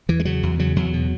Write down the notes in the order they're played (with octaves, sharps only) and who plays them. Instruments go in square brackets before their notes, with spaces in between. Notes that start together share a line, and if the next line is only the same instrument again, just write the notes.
[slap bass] E2 E3
G#3
C#3 F#3
E2
C#3 F#3
E2 F#3
B2